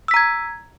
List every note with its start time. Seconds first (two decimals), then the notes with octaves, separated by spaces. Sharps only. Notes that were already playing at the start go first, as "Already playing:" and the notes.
0.08 E6
0.11 B6
0.14 A#5
0.17 G#6